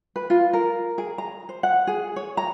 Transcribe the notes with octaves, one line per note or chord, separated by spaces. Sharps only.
B4
F4
A#4
G#4
A#5
C5
F#5
G#4
C#5
A#5